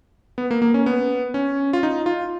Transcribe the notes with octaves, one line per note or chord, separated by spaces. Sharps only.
B3
A#3
A#3
C#4
B3
C#4
F4
D#4
F4